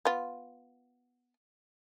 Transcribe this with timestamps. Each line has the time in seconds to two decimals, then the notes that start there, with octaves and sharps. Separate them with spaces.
0.05 B3 F4